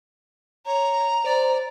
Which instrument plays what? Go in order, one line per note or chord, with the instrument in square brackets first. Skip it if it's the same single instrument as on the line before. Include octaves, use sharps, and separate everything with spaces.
[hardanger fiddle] C#5 [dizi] A#5
[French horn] C5 [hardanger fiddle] D5